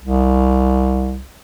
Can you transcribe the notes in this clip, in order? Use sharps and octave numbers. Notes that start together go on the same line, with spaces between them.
C2